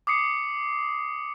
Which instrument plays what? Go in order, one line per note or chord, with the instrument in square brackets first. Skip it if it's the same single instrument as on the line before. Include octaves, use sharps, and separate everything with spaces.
[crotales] D6 D#6 C7 C#7